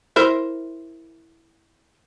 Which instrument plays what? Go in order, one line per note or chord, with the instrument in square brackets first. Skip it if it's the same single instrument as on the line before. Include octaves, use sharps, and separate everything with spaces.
[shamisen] E4 A#4 C5